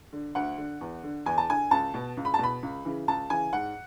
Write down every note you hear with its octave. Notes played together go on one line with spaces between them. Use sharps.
D3
D2 F#5
D3
E2
D3
E2 G#5
A5
D3 G#5
C#2 A5
B2
C#2
B5
A5
B2 B5
C#2
C#3 E3
C#2 A5
C#3 E3 G#5
G#2 F#5